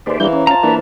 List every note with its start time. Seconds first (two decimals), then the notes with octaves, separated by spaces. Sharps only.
0.06 D#2 G#3 B4 C5 D5 E5
0.20 E3 G3 A#3 D4 A#4 C5 G6
0.33 C#4
0.47 F4 A5 A#5
0.63 E3 A#3 D4 B4 E6